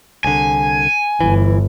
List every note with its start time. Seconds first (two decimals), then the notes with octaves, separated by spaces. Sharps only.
0.24 C2 D3 G#5
1.21 G1 E3